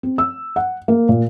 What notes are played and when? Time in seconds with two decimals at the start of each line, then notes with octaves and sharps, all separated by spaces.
0.03 C4
0.18 E6
0.56 F#5
0.88 A#3
1.09 A#2